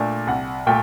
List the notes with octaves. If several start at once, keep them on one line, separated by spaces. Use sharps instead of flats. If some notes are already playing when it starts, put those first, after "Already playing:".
Already playing: A#2 A3 D4
C2 F#5
A#2 A3 G5